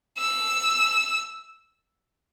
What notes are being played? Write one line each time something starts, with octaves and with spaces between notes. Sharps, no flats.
E6